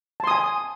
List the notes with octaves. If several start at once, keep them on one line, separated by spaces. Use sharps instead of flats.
G#5 A5 C6 D#6